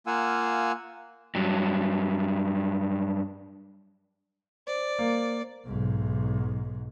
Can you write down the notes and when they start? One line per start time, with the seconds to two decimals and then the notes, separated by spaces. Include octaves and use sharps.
0.07 A#3 F4 F5 F#5 G#5 E6
1.35 G2 F#3
4.67 C5 D5
4.99 A#3
5.66 B1 G#2